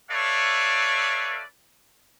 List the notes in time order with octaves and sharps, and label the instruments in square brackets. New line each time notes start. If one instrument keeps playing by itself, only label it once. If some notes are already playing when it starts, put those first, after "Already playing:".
[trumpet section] A4 B4 C#5 D5 E5 F5